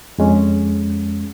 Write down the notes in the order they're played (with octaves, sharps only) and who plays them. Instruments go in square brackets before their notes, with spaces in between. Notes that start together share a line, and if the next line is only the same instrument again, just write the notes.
[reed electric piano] F2 G#3 C#4